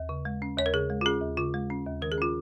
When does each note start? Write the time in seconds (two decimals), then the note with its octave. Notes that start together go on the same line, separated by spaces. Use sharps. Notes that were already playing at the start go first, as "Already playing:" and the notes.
Already playing: D#2
0.09 C#3
0.25 G#3
0.42 C#4
0.58 D#2 C#5
0.66 A#4
0.74 C#3 G#4
0.90 G#3
1.01 F4
1.06 C#4 G#4
1.22 D#2
1.37 C#3 F4
1.54 G#3
1.70 C#4
1.86 D#2
2.02 D#3 A#4
2.12 G#4
2.18 C#4 F4